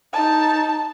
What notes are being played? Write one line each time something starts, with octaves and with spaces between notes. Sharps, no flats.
D#4 A5